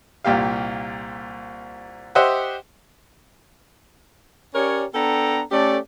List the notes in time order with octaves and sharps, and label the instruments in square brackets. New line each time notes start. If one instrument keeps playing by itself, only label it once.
[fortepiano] C2 A#2 G4 F5
G4 C5 D#5 E5 F#5
[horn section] C#4 G4 A#4 C#5 D5
B3 D4 A4 G5 A#5
A3 C#4 G4 A4 D5